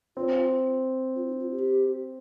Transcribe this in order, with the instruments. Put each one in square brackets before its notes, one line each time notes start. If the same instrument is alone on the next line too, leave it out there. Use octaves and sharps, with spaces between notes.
[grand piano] C4 [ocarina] F4
[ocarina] F4
D#4
F4
G4